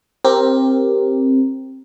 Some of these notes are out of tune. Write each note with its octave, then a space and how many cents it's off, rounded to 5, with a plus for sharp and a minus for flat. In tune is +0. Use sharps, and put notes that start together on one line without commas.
C4 +15 G4 +0 A#4 +0